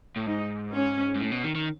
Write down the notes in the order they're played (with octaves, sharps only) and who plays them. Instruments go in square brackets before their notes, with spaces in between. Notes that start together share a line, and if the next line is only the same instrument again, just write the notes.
[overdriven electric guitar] A2
[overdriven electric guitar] G#2 [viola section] D#4
[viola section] C#4
[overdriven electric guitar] G#2
A2
B2
D#3
D#3